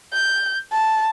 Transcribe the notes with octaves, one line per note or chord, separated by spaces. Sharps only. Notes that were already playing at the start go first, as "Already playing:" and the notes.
G6
A5